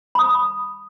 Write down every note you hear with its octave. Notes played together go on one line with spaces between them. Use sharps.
B5 D#6